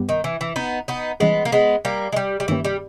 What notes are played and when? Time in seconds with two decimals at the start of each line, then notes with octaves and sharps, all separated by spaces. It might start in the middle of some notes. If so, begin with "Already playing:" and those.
Already playing: G2 G3 B3 G4
0.09 D#3
0.24 E3
0.41 E3
0.56 B3 D#4
0.88 B3 D#4
1.20 E3 G3 G#3 B3 C#4 G#4
1.45 A#3
1.52 G#3 B3
1.85 G3 A#3
2.12 G#3
2.16 G3
2.40 G3
2.48 G2 D#3 E3 A#3 C#4 G4
2.65 G3